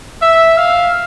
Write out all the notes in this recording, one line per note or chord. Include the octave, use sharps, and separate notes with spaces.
E5
F5